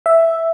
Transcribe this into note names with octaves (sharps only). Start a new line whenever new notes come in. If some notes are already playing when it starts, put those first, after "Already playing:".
E5